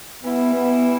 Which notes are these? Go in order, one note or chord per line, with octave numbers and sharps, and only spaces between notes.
E3 G3 B3 E4
B3